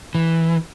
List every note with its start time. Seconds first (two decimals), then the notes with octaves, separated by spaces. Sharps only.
0.15 E3